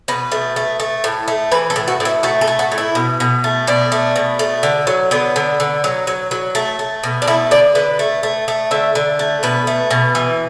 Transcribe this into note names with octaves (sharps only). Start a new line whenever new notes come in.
B2 B4
A3
A3
A3
A2
A3
E3 B4
A4
A2
F#4
A2
E4
A3 F#4
A4
A3
F#4
A2
E4
B2
B2
A3
B2 D4
A3
B2
A3
D3
F#3
D3 B3
D3
D3
F#3
F#3
F#3
A3
A3
B2
D4
A3 E4
D3 D5
D3 B4
A3
A3
A3
D3 E5
D3
A3
B2 B4
A3
B2
E3